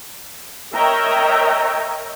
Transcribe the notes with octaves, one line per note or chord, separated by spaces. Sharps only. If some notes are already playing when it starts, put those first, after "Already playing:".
A#4 C#5 D#5 E5 G5 A#5